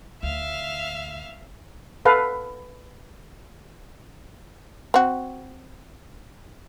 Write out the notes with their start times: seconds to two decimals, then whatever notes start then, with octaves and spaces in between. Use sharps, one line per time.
0.23 D2 E5 F5
2.05 A4 B4 F5
4.94 C4 F#4